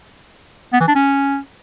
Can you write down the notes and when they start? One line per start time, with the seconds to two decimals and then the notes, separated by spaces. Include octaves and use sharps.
0.73 B3
0.80 E3
0.88 D4
0.95 C#4